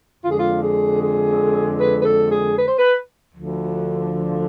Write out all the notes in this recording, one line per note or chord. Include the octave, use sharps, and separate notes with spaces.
F2 D3 G#3 F4
G#4
F4
G#4
G#4
B4
B4
A4
G#4
B4
C5
B4
D2 D3 F3